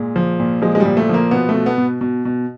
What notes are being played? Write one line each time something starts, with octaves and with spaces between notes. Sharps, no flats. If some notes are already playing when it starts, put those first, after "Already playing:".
Already playing: A#2 G#3
F3
A#2
F3 G#3
G#3
A#2 G3
A3
F3 A#3
B2 B3
A3
B2
B3
B2
B2
B2